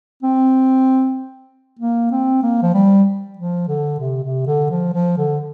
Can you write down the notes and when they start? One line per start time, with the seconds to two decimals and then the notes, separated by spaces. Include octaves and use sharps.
0.23 C4
1.80 A#3
2.11 C4
2.43 A#3
2.62 F3
2.74 G3
3.37 F3
3.68 D3
4.00 C3
4.23 C3
4.47 D3
4.70 F3
4.94 F3
5.18 D3